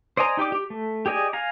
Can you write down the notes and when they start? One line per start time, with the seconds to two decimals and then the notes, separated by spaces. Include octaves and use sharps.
0.17 C5 D5 D#5 G#5 A#5
0.37 D#4 G4 D5 D6
0.52 G4
0.70 A3
1.06 G4 G#4 D5 D#5 G#5
1.33 F5 G#5 A#5